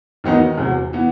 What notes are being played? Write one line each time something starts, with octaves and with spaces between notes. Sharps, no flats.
D#2 D#3 F#3 B3 D#4
E2 C3 F#3
E3 B3